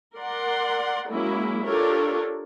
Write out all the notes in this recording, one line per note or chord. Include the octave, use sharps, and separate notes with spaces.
A#4 D5 F#5 C6
F#3 G#3 A#3 C#4 E4
D4 F4 G4 A4 A#4 C#5